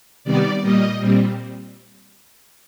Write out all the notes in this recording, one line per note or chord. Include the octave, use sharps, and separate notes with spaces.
C3 D#3 G3 B3 D5
A#2 G3 A#3 D#5
A#2 G3 C4